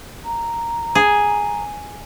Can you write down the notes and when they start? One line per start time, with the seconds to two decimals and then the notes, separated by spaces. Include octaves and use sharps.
0.25 A#5
0.95 G#4